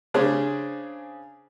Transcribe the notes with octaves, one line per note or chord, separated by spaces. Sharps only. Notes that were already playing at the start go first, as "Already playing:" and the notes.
C#3 C#4 D4 G#4 C5